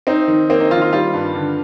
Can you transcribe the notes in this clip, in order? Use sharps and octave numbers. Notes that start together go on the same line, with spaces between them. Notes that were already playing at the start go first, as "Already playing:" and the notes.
C4 D#4
D#3
A#3 C4
D#4
D#3 F4
F4
G3 F4
G2
D3